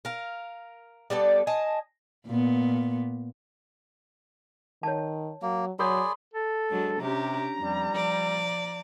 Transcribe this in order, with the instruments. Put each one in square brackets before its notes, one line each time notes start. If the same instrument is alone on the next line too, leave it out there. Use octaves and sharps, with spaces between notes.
[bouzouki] A#4 F5
G3 B3 A4 D5
D#5 G#5 A5
[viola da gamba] A#2 B3
[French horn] D#3 [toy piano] C#5 A5
[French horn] F#3 [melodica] A#3
[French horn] F#3 [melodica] G#4 D5 [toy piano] A#4 C#5 [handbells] B5 C6 D#6
[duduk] A4
[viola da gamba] F#3 G#3 D4
[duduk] C3 [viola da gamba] C#4 D4 G4 [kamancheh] A#5
[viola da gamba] F2 [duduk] G3
[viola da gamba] F3 D5